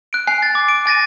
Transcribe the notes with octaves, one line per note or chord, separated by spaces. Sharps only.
F#6 D7
G#5 F#6 C7
A6
D6
D7
G#5 A6 A#6 D#7